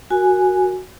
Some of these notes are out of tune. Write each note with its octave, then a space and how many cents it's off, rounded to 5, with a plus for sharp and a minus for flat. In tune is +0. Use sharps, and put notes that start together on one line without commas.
F#4 +0 A#4 +0 G#5 +0